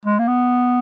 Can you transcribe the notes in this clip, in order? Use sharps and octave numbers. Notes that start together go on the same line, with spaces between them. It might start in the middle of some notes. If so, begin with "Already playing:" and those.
G#3
A#3
B3